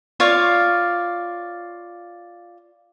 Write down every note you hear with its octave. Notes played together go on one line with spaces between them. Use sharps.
F4 C#5 D5 F5